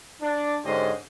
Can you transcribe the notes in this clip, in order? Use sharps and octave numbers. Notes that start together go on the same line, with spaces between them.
D4
G#2 D3 C#4 G4 C5 D#5